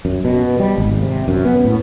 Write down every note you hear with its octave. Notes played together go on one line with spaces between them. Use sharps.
F#2
B2
G3
G#1
C3
F#2
B3
A2